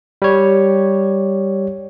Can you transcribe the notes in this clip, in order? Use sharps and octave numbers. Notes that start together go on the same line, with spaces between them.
G3 C#5